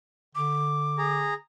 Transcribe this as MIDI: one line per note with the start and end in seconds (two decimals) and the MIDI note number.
0.35 1.35 50
0.35 1.17 86
0.98 1.34 68
0.98 1.34 82